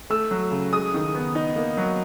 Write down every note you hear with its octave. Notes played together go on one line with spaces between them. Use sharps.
A3 E6
F#3
C#3
G#3 D#6
D#3
B3
D#4
A#3
F#3